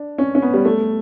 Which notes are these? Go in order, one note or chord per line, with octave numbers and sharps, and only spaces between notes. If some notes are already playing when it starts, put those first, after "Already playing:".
Already playing: D4
C#4
C#4
B3
G3
A3